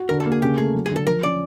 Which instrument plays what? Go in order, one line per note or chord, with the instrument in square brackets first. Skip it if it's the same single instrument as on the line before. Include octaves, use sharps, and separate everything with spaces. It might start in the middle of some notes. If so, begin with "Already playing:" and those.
Already playing: [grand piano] F#4
[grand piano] D3 [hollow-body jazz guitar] A#4
[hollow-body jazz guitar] A4
[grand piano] A#3
[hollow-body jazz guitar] G#4
[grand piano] C#3 [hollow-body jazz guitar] G4
[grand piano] A3 [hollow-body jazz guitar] G#4
[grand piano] F#3
[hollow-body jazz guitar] G#4
[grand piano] D3
[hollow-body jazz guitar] A4
[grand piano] F3 [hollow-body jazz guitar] A#4
[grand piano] C#4 [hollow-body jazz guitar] D5